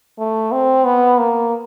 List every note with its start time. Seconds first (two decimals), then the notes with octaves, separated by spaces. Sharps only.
0.19 A3
0.52 C4
0.85 B3
1.19 A#3